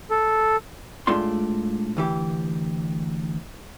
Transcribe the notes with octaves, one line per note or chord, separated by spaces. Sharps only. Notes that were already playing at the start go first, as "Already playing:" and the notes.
A4
A2 G#3 A3 D4 F4 C6
D2 E3 G4